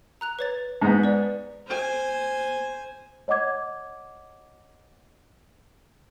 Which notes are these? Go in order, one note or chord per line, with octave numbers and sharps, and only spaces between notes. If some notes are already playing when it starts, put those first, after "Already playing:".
A#5 F#6 F7
B4 C#5 A6
G#2 B3
B4 D5
C5 G#5
C#5 D#5 F#5 D6 G#6